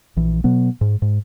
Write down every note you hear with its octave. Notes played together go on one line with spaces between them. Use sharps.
A#1 E3
B2 F#3 B3
G#2
G#2